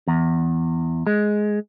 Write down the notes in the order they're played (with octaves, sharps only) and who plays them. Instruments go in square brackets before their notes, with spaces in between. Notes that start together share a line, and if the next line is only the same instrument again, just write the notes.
[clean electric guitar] E2
G#3